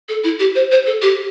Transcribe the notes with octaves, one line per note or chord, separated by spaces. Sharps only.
A4
E4
G4
C5
C5
A4
G4